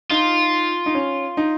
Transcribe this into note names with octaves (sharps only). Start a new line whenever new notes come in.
D#4 F4
D#4
C#4
D#4